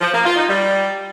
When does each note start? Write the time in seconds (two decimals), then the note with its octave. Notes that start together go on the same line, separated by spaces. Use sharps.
0.01 F3
0.12 A#3
0.24 F4
0.36 D#4
0.48 G3